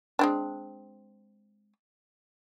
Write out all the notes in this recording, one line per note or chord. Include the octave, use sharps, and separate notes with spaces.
G#3 C4 D4